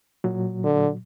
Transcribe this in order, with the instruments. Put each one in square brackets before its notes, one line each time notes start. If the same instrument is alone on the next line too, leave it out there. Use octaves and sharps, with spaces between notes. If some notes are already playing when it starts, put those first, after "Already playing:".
[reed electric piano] A#2 F#3
[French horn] D3